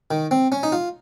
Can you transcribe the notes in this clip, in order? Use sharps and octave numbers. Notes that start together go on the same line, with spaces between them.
D#3
C4
C#4
D#4
F4